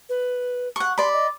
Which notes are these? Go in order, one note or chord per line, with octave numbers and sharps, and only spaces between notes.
B4
F#5 C#6
D5 B5 C6
D#5